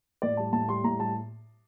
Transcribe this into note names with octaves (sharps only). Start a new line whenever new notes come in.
A2 D5
G3 A5
A2 A5
G3 C6
A2 A#5
G3 A5